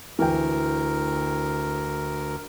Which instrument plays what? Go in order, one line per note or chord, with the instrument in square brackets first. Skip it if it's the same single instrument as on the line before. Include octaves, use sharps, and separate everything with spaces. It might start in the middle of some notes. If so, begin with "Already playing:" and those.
[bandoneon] D2 A#4 [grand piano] E3 G5